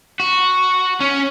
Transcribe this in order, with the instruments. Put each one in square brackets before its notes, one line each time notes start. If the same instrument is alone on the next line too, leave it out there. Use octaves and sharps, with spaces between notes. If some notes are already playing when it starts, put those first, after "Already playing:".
[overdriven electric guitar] F#4
C#4